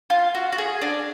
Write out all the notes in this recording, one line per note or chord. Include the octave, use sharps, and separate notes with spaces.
F4
F#4
F#4
G#4
D4